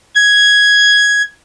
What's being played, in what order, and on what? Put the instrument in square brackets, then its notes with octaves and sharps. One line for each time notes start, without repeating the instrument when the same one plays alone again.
[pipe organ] G#6